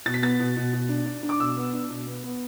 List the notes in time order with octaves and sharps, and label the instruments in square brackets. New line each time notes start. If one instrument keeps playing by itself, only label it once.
[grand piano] B2 A6
B6
B3 A6
B2
B2
B2
D4
D4
D4
D6
B2 E6
B3
D4
B2
B3
B3